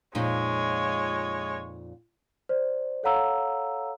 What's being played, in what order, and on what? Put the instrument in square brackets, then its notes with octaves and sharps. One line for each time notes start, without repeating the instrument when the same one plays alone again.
[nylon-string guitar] F2 A#2 D#4 [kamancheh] G#3 C#5
[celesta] C5 D5
A4 C#5 F5 F#5 A#5 E6